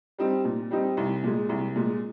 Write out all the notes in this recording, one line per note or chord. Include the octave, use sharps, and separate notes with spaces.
G3 C4 D#4
A#2
G3 C4 D#4
C2
A#2 G#3
C2
A#2 G#3